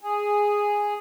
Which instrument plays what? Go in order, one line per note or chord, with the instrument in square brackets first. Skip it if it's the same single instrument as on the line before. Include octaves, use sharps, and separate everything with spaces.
[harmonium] G#4